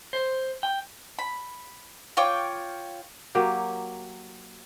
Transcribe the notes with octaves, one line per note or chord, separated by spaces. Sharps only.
C5
G5
B5
F4 C#5 G5 D6
F#3 A#3 G4